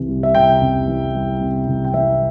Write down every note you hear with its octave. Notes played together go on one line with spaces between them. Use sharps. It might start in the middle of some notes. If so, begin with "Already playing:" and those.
Already playing: C2 E3
G3
E5
C3 G5
C2
E3
G3
C3
C2
G5
E3 E5